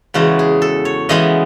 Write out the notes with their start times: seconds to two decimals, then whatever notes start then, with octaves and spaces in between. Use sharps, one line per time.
0.14 E2 C#3 E3 G#3 F#4
0.39 G#4
0.62 A4
0.85 C#5
1.09 C#3 E3 G#3 B3 D#5